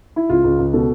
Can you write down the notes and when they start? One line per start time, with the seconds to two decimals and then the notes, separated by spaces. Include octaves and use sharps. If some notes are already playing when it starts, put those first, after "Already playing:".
0.16 E4
0.29 C#2 F4
0.44 C#2
0.59 C#2
0.73 B2 A4